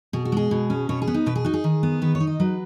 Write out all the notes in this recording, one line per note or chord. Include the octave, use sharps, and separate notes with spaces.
B2 G#4
F#4
G#3 G#4
B2
C#4
B2 C#5
G#4
B3
D#4
B2 B4
G#4
D#4 F#4
G#4
D#3
B3
D#3 B4
C#5
D#4
D#5
F#3 B4